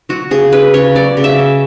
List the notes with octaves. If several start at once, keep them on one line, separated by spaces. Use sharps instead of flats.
F#3 F#4
C#3 G#4
C#4 B4
C#3 C#5
F#3 D5
C#3
E5
C#4